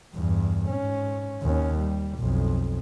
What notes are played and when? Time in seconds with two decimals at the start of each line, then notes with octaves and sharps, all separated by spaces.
0.15 E2 G2
0.69 G#2 C#4
1.42 D#2 C#4
1.79 G3
2.19 B1 F2